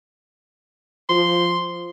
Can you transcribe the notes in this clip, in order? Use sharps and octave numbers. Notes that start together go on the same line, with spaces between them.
F3 C6